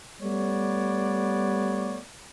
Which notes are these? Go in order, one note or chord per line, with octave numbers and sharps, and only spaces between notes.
G3 A3 B3 C#5 D5